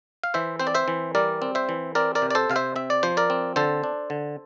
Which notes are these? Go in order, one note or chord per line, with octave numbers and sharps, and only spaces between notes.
F5
E3 C5 E5
C4 C5
D5
C5 E5
E3
G3 A#4 D5
C4
C5 E5
E3
C4 A#4 D5
A#4 D5
C3
D5
A4 C5
C3 F5
C5 E5
C4 E5
D5
F3 C5
A#4 D5
C4
D3 A4 C5
D4
D3